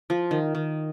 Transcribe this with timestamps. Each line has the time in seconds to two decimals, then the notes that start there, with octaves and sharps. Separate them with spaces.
0.10 F3
0.31 D#3
0.55 D#3